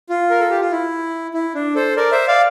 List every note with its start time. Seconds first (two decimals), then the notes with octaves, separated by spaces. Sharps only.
0.09 F4
0.30 A#4
0.40 A4
0.50 G4
0.61 F4
0.71 E4
1.34 E4
1.55 D4
1.75 A4 C5
1.96 A#4 D5
2.12 C5 E5
2.28 D5 F5